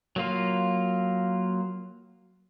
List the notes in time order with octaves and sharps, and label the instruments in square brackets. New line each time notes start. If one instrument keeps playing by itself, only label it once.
[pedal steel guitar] F#3 A#3 F4